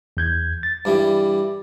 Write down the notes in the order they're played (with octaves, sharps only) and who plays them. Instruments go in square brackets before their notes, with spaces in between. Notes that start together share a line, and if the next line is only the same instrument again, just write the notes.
[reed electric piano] E2 G6 G#6
A6
[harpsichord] G2 E3 G3